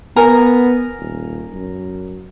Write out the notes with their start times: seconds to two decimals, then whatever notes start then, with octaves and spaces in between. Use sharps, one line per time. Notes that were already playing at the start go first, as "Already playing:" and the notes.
0.16 B3 A#4 G#5 A#5
1.00 D#1
1.53 F#2